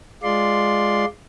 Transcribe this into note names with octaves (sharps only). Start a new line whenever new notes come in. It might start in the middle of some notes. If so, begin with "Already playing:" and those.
G#3 F4 D5 C6